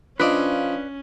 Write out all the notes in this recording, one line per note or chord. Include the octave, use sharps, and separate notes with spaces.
F3 C#4 D4 B4 D5 D#5 F5